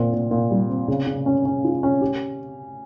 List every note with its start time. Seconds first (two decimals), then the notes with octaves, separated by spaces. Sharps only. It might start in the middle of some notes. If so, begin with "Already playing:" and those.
Already playing: A#2 C4
0.13 A#2
0.31 A#2
0.51 G3
0.69 C4
0.88 C#3
1.07 C#3
1.26 C#4
1.45 C#4
1.64 F4
1.83 C#4
2.02 G4